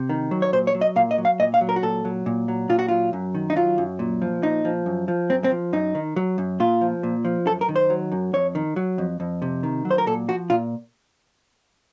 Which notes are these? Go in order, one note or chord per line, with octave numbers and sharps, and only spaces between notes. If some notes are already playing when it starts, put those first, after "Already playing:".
Already playing: C3
D#3
F#3
C#5
A#2 C5
C#5
F#3
D#5
A#2 F5
D#5
F#3
F5
A#2 D#5
F5
F#3
A#4
F#4
A#2 A4
F#3
A#2
F#3
A#2 F4
F#4
F#3 F4
F#2
D#3
D#4
F#3 F4
F#2
A#2
F3
A#2 D#4
F3
F#2
F3
F#2 C4
C4
F3
F#2 D#4
D#3
F#3
F#2
A#2 F4
F3
A#2
F3
F#2 A4
A#4
D#3
C5
F#3
F#2
F2 C#5
D#3
F#3
F2
F2
C3
D#3
F#3
C5
A#4
A#2 A4
F3 F#4
A#2 F4